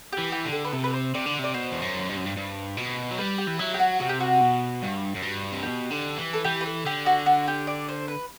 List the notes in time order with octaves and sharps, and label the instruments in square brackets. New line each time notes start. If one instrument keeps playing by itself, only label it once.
[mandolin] G4
[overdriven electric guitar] E3
[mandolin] G4
[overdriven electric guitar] D3
[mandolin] A4
B4
[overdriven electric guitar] C3 [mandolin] A4
[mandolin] B4
C5
[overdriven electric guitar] C3 [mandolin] D5
[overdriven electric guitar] D3
[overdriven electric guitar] C3 [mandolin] D5
[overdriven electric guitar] B2 [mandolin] C5
[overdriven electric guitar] E2
F#2
G2
F#2
G2
G2
B2
F#3
[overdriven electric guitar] G3 [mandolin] B4
[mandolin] G4
[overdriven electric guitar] E3
[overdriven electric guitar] F#3 [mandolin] E4
[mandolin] G4
F#4
[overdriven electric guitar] C3 [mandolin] F#4
[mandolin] G4
F#4
[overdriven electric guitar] B2
G2
F#2
G2
C3
[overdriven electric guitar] B2 [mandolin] G4
[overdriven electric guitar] D3
E3
[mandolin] A4
[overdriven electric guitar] E3 [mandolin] G4
[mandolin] B4
A4
[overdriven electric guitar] D3 [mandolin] G4
[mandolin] F#4
F#4
G4
D5
C5
B4